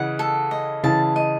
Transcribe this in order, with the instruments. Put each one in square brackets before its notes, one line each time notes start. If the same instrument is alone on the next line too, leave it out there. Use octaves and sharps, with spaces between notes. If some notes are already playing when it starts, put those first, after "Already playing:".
Already playing: [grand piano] C#3 E3 [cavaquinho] D#5 F#5
[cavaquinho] A4
D#5
[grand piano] C#3 E3 [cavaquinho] A5
[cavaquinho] D#5